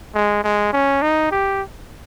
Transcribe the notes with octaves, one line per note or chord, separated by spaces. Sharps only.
G#3
G#3
C#4
D#4
G4